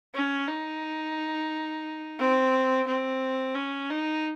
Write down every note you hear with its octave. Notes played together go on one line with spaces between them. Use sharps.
C#4
D#4
C4
C4
C#4
D#4